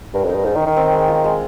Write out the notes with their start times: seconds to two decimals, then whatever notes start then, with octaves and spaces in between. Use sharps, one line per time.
0.14 G2 A#4
0.24 F2 D#4
0.35 G2
0.45 G#2 D#4
0.56 D#3
0.61 D#4
0.66 D#3
0.77 C4
0.93 G#3
1.08 F4
1.24 G#3